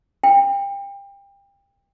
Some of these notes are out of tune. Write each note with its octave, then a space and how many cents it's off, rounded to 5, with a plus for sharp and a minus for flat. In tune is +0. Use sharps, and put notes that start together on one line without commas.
G5 +25